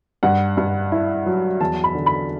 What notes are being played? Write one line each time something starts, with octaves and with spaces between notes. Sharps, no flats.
G2 F#5
G2
E4
F#3
E2 A5
B5
D3
B5